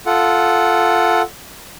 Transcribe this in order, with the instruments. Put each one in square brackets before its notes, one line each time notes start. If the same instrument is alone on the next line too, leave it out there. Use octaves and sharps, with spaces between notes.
[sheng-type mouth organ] F4 A4 F#5